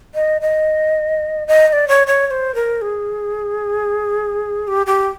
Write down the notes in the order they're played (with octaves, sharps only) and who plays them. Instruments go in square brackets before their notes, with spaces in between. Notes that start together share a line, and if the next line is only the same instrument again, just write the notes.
[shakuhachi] D#5
D#5
D#5
D#5
D5
C#5
C#5
C#5
C5
A#4
G#4
G4
G4